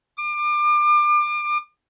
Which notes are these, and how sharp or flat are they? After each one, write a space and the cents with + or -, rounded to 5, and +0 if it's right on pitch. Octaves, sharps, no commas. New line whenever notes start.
D6 +35